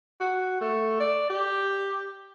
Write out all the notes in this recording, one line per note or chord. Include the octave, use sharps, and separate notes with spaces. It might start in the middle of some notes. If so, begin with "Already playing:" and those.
F#4
A3
D5
G4